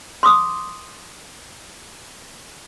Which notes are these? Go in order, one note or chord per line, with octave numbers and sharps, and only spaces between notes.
C6 D6 D#6